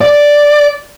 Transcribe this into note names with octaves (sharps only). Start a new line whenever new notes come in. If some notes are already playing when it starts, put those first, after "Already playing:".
D5